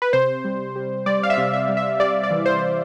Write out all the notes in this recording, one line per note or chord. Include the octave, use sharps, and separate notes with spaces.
B4
C3 C5
G3
G3
G3 D5
F5
E5
C3
E5
G3
E5
G3 D5
D5
E3
C5